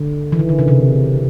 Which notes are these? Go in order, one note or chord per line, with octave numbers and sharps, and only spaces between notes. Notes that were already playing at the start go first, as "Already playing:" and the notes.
Already playing: D3
E3
D#3
D3
C#3
C3